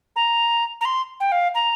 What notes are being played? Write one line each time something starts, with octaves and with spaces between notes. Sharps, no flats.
A#5
A#5
C6
G5
F5
A#5